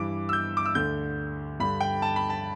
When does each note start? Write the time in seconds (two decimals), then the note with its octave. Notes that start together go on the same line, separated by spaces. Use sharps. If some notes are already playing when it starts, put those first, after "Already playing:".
Already playing: G2 E3 D6
0.29 E6
0.33 G6
0.57 D6
0.66 E6
0.75 D2 D3 G6
1.60 G2 D3 B5
1.81 G5
2.02 A5
2.16 B5
2.30 A5